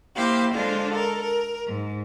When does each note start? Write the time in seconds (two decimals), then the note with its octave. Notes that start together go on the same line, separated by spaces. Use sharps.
0.15 A#3 E4 G4 C5 F5
0.54 D3 G#3 D4 F4 C5
0.91 A4 A#4
1.24 A#4
1.65 G#2